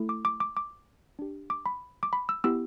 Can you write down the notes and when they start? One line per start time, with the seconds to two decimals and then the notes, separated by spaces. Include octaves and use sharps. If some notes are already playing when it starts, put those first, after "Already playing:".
Already playing: A3 E4 A4
0.09 D6
0.25 D6
0.40 D6
0.57 D6
1.19 D4 G4
1.50 D6
1.66 B5
2.03 D6
2.13 B5
2.29 E6
2.44 B3 E4 G4 E6